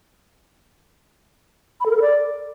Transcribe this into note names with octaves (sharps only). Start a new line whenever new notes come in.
B5
A4
A#4
A4
D5